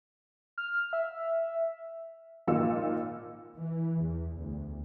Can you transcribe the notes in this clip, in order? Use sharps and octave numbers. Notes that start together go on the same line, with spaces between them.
F6
E5
G#1 A#2 F4 D#5 E6 C#7
E3
E2
D2